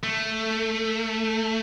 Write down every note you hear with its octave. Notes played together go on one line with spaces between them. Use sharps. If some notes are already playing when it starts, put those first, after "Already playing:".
A3